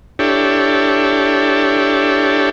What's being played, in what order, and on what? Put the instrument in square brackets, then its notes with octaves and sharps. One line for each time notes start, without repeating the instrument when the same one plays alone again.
[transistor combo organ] D4 E4 G4 A4 C#5